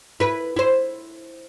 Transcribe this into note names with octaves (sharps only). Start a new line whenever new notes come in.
E4 B4
E4 C5